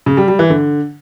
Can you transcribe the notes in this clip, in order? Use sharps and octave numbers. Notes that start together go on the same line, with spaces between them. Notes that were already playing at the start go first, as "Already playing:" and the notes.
C#3
G3
G3
E3
D3